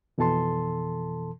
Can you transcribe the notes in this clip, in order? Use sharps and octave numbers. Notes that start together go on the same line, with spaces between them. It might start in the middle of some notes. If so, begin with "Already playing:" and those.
F2 B2 E3 A4 A5 C6